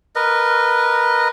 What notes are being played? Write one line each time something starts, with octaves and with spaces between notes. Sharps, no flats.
A#4 B4 D#5